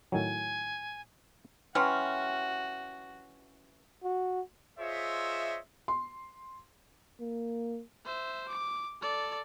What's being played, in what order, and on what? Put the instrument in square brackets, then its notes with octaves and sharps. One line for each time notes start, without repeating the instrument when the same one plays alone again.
[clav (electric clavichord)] A2 D#3 F#3 [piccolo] G#5
[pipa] E3 F#3 C#4 [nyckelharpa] F#4 [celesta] G5 C6 F6
[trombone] F#4
[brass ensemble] F4 G#4 C5 C#5 D#5 E5
[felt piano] C6
[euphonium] A#3
[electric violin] C5 E5
D6
A4 D5